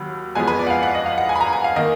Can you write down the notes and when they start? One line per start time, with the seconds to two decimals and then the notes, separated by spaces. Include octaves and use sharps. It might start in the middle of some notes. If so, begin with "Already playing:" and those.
Already playing: D#2 F#3 B5
0.35 F2 F3 G#3 B3 G#5
0.47 B4
0.59 D5
0.67 F#5
0.70 F5
0.83 F#5
0.95 D#5
1.06 F5
1.18 F#5
1.29 G#5
1.35 B5
1.41 A#5
1.53 G#5
1.64 F5
1.76 D#3 A#3 D#5